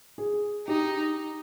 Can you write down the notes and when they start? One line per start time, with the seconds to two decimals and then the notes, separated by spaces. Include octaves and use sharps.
0.18 G#4
0.68 D#4 G4